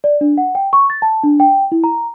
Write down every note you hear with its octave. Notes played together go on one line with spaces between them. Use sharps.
D5
D4
F#5
G5
C#6
A6
A5
D4
G5
E4
A#5